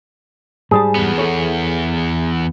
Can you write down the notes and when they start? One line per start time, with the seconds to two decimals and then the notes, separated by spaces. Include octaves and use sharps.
0.71 G#2 G3 G#4 A5
0.95 E2 B3
1.18 A4 C#5